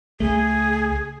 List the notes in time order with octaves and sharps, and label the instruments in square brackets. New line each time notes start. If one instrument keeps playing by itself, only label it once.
[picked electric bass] C#2 A3 [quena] G#4